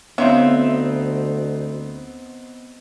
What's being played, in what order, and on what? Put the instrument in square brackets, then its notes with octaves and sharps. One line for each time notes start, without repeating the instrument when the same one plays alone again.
[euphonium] D2 [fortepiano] B3 C4 D#4 [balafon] C#5 F5 C6 [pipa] E5